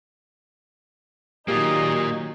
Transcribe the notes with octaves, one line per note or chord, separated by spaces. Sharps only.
D#3 F#3 A#3 D#4 F4 G4 G#4